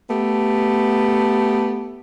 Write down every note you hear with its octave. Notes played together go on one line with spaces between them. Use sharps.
A3 B3 G4